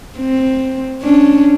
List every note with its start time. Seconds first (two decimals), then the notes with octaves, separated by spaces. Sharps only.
0.18 C4
1.02 C#4 D4